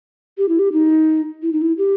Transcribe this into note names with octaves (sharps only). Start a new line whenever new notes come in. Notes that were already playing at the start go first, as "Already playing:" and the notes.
G4
E4
G4
D#4
E4
D#4
E4
G4